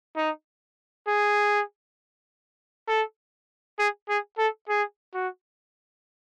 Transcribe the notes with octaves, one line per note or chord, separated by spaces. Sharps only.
D#4
G#4
A4
G#4
G#4
A4
G#4
F#4